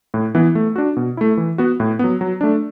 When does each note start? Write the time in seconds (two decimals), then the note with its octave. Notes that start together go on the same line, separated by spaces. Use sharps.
0.14 A2
0.35 E3 B3 E4
0.55 A3
0.76 D4 F#4
0.97 B2
1.17 A3 E4
1.37 E3
1.58 B3 F#4
1.80 A2
1.99 F#3 B3
2.21 F#3
2.41 A3 D4